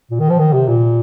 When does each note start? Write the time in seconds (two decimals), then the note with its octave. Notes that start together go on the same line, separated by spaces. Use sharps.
0.10 A#2
0.19 D#3
0.29 F3
0.39 D#3
0.53 C3
0.68 A#2